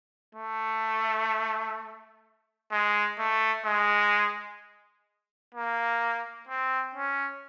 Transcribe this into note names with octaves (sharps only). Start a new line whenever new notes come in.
A3
G#3
A3
G#3
A#3
C4
C#4